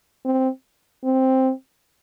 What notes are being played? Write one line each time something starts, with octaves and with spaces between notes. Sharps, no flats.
C4
C4